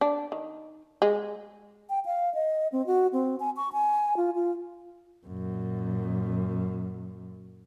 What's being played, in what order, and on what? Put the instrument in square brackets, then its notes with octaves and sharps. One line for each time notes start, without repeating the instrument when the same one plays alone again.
[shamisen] D4
D#3
G#3
[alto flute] G5
F5
D#5
C4
F#4
C4
G#5
C#6
G#5
F4
F4
[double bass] F#2 A#2